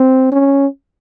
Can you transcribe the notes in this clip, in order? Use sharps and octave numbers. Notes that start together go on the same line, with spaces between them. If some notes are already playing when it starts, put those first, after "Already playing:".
Already playing: C4
C#4